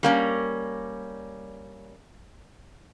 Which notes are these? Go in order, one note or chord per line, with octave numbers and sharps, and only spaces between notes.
G3 A#3 C#4